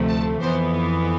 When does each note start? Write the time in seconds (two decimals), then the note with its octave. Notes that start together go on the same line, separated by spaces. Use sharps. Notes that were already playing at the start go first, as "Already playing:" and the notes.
Already playing: D2 C3 F3 A3
0.09 A5
0.41 F2 E3 B3 C5